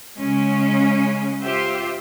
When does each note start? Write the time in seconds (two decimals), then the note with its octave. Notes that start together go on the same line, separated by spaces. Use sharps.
0.17 C#3 G#3 C#4
1.41 F4 G4 C5 E5